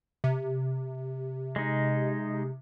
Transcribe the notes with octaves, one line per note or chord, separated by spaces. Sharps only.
C3
G#3 D#4